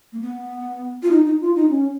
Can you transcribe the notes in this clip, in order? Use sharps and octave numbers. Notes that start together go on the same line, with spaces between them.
A#3
B3
F4
D#4
D#4
F4
D#4
C#4